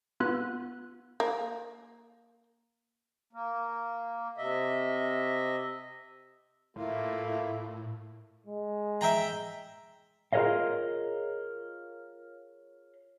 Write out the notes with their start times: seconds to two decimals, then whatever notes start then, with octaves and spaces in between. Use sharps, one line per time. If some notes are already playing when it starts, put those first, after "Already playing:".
0.20 B3 F4 F#6
1.20 A#3
3.33 A#3
4.38 C3 D#5 E5
6.76 A2 A3 A#3 E4 F4
8.46 G#3
9.01 E5 G5 A#5
10.33 F4 G#4 A#4 C#5 D#5 F5